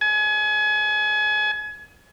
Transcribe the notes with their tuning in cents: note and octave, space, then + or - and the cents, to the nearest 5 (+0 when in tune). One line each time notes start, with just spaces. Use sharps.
G#5 +35